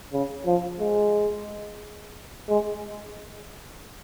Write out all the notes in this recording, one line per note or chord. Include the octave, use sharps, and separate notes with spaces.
C#3
F3
G#3
G#3